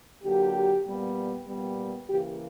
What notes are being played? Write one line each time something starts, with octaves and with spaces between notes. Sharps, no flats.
D3 F#3 A#3 G4
A#2 G3 B3
A#2 G3 B3
C#3 E3 A#3 G4